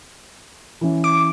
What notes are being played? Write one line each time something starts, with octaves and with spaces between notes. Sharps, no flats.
E3 C#4
D6